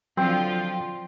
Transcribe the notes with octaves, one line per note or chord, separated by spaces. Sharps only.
D3 F3 F#3 C4 F4 G5